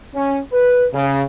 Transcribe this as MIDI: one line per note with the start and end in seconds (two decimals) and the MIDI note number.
0.15 0.38 61
0.53 0.85 71
0.93 1.22 49